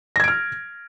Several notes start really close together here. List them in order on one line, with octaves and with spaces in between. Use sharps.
A#6 G#6 D7 F6